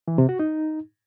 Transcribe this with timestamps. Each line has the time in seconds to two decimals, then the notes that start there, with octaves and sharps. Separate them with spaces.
0.08 E3
0.18 C3
0.29 F#4
0.39 D#4